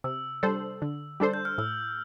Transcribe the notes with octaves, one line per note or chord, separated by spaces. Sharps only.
C3 E6
G3 D4 A4 C5
D3
G3 D4 A4 C5
G6
F6
A2 E6